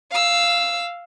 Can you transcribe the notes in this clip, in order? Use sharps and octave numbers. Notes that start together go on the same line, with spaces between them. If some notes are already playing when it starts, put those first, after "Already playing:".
F5 E6